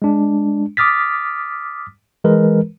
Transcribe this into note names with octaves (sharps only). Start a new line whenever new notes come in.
G#3 D4
D6 D#6 F6 A6 B6
E3 G#3 A#4 B4